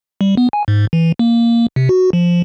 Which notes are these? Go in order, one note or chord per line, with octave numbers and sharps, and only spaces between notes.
G3
B3
G#5
G#2
E3
A#3
C3
F#4
F3